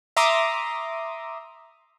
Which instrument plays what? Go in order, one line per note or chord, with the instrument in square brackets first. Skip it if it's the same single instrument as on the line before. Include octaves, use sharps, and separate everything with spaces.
[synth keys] E5 A#5 C6 D6 D#6